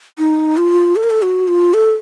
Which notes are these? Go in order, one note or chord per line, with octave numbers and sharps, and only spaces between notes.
D#4
F4
A4
A#4
A4
F#4
F4
A4